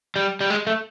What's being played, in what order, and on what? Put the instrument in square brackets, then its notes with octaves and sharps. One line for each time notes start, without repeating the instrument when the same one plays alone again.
[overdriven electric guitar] G3
G3
G#3
A3